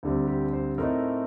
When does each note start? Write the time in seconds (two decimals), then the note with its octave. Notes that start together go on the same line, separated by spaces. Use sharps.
0.03 D2 D3 G3 C4
0.27 G4
0.53 C5
0.78 A2 A3 C4 D#4 A#4